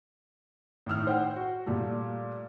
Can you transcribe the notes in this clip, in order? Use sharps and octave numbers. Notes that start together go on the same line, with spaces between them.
A2 D#3 E6 F6
C5 F#5 G5
F#4
A#2 G3 A3